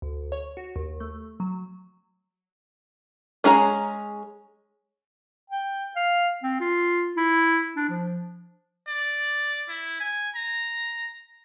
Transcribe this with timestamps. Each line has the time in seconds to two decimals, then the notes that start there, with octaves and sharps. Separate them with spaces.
0.02 D2
0.32 C#5
0.57 F#4
0.76 D#2
1.00 A3
1.40 F#3
3.44 G#3 C#4 G#4 A#5
5.50 G5
5.96 F5
6.43 C4
6.60 F4
7.16 E4
7.76 D4
7.90 F3
8.88 D5
9.69 E4
10.00 G#5
10.36 A#5